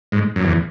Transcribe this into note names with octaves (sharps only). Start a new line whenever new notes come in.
G#2
F#2
E2